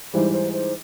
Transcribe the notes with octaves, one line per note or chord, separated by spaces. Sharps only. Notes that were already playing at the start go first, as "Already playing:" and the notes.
G#2 E3 G3 C5
C5
C5